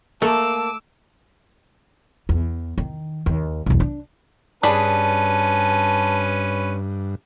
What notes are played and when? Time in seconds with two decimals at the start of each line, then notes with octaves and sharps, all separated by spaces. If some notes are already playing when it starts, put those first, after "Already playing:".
0.22 A3 A#3 A5 D6 E6
2.29 E2
2.78 D#3
3.26 D#2
3.66 B1 E2
3.80 D4
4.63 G2 C#4 D4 G#4 B4 A5 B5